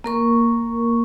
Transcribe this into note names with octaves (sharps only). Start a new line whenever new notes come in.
A#3 A#4 C#6